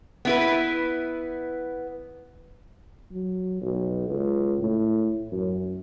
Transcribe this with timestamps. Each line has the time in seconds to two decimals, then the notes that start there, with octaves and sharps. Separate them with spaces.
0.25 B3 E4 B4
3.12 F#3
3.61 B1
4.09 C#2
4.60 A2
5.32 F#2